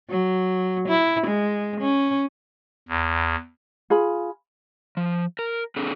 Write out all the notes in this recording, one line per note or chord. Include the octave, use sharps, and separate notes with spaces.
F#3
E4
G#3
C#4
E2
F4 G#4 B5
F3
A#4
C4 D4 G#4 A4